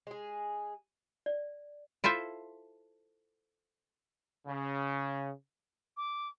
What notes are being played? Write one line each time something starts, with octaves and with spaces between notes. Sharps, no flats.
G#3 G#4
D5
E4 F4 A4 C5 E5
C#3
D6